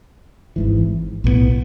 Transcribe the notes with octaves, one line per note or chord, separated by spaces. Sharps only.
G#1 G#2 E3
B1 A2 F#3 B3